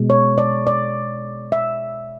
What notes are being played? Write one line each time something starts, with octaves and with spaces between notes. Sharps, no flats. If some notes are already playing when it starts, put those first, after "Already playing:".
Already playing: B2 G#3
C#5
D5
D5
E5